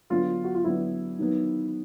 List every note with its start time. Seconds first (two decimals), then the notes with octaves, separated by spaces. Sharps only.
0.10 D3 F#3 B3 D4 F4
0.44 F#4
0.55 F4
0.64 D3 F#3 B3 D4 E4
1.19 D#3 F#3 B3